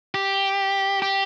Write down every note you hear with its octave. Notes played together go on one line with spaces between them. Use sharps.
G4
G4